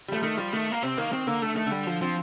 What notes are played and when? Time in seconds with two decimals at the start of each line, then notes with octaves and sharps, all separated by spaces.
0.08 G3 A3
0.16 F3
0.23 D#3 A3
0.37 F3 G3
0.52 D#3 A3
0.72 A#3
0.83 C3 C4
0.98 D#3 A#3
1.12 D#3 C4
1.27 D3 A#3
1.42 D3 A3
1.54 D#3 A3
1.67 D3 G3
1.87 F3
2.02 F3 C4